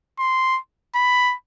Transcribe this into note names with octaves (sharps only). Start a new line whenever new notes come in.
C6
B5